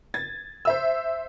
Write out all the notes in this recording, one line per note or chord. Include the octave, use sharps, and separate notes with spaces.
G#6 A6
C5 E5 E6